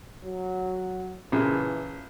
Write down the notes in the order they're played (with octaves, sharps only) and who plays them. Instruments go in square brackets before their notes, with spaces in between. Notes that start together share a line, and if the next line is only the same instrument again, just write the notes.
[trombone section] F#3
[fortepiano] A#1 C#3 [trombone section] E3